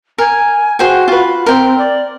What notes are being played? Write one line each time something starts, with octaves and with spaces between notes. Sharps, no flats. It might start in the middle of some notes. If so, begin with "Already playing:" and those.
A#4 G#5
F#4 G#4 C5 G5
F4 B4
C4 A#4 G5
D5